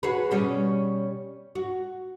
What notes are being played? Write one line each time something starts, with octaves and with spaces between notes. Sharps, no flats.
F#4 G#4 B4
B2 G3 C#4
F#4